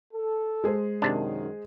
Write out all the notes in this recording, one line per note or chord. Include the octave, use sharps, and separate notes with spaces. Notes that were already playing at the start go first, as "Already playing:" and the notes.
A4
G#3 G#4 C5
F#2 C3 D#3 D4